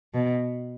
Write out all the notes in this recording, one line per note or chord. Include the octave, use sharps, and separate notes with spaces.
B2